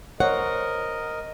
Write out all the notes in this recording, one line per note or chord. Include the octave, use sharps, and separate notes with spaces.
A#4 C5 C#5 D#5 F#5